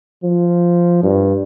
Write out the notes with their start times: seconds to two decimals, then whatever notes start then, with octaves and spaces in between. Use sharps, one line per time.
0.23 F3
1.03 G2